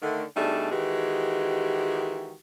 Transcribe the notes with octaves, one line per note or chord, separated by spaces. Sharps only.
D3 D#3 A3
B2 G3 A3 D4 D#4 G#4
D#3 E3 G#3 F#4 G4